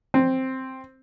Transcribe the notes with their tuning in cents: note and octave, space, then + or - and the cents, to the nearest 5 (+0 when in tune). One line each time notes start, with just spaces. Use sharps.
C4 +5